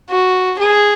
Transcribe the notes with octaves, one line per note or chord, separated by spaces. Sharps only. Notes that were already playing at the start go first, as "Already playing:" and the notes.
F#4
G#4